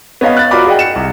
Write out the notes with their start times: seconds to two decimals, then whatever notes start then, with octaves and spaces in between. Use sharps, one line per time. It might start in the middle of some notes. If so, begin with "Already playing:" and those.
0.21 B3 C#5 D#5 F5 B5
0.37 F#6 A6
0.51 F4 F#4 A#4 D5 B5 D6
0.66 G#4 D5 D#5 F#5 G5
0.79 C#7 E7
0.96 C2